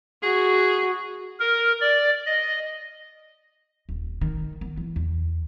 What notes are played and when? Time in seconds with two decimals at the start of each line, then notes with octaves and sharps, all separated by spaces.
0.23 F#4 G#4
1.40 A#4
1.81 D5
2.26 D#5
3.89 D#1
4.21 D#3
4.61 B3
4.77 E3
4.96 E2